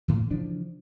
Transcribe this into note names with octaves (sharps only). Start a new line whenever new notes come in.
A2 E3
C#3 E3 F3 D4